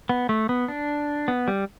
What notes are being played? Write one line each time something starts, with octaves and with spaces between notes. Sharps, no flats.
B3
A3
B3
D4
B3
G3